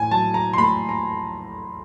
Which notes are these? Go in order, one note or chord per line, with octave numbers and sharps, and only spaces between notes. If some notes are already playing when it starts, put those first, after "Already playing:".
Already playing: A2 G#5
F#3 A5
A#5
C6
A3 B5
A#5